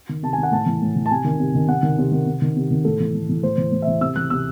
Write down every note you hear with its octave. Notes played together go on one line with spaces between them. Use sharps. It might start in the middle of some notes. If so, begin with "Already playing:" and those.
D#3
C3 A5
G#5
D#3 F#5
A2 A5
E3
A2
E3
A5
C3 G#5
D#3
C3
D#3
C3 F#5
D#3
C3
D#3
C3
D#3
C3
D#3
A2 A4
E3
A2
E3
A2 C5
E3
A2
E5
E3
C3 E6
E3 F#6
C3 E6